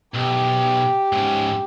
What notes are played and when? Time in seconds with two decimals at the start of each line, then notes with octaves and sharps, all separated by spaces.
0.15 B1 G4
1.12 G#2 C#3